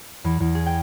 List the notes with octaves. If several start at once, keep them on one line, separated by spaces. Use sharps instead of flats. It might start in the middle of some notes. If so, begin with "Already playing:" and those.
E2
E2
G#4
G5